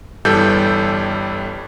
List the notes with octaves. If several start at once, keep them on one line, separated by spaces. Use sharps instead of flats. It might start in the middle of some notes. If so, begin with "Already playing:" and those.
G1 E3 G3 A4 G6